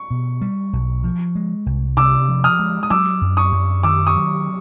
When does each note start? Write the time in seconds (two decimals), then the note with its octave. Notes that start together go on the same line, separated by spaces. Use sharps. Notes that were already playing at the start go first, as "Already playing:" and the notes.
Already playing: C#6
0.11 B2
0.41 G3
0.73 B1
1.04 F3
1.35 G#3
1.66 C2
1.97 C3 D6 E6
2.28 F3
2.44 D#6 F6
2.59 G#3
2.83 D#6
2.90 F#3 D6 E6
3.21 F#2
3.37 C#6 D#6
3.52 F#2
3.83 D#3 D6 E6
4.07 C#6 D#6
4.15 F#3